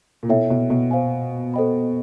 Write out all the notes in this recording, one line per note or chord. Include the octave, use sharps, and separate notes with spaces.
A#2
B2 E4 A4 C#5 E5 G5
B2
B2
C5 F5 G#5
A4 C5 D#5 G5 B5